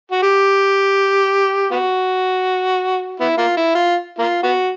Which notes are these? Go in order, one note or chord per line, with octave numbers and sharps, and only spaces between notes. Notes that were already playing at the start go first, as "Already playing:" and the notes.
F#4
G4
B3 F#4
B3 E4
A#3 F4
E4
F4
A#3 F4
B3 F#4